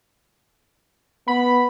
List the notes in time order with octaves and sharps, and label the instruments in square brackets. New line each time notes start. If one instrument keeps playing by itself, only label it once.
[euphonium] B3 [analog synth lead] B5